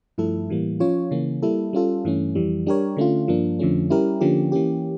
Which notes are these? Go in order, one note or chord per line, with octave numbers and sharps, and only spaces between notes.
G2 F3 A3 E4 A4
A2 E3 G3 A#3
F3 C#4 F4 C#5
C#3 E3 A#3 C#4
G3 A#3 E4 A4
G3 C#4 F4 A4
G2 E3 A3 C#4
F2 E3 G3
G3 D4 G4 A#4 C#5
D3 A3 C#4 F4
G2 F3 A#3 D4
F2 D3 F3 A3 C#4
G3 C#4 E4 G4 A#4
D3 F3 A#3 C#4 G4
E3 A#3 C#4 G4